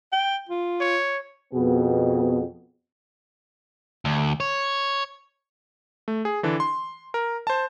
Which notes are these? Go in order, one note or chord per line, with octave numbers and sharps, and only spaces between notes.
G5
F4
C#5
F2 B2 B3 G#4
D2
C#5
A3
G#4
D3 E3 D4
C6
A#4
C5 A5